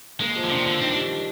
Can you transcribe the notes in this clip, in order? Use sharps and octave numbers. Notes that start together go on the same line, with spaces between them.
G#3 A#3
F3
D3
C3 D4
D3 F3
D#3 C4
D4
G3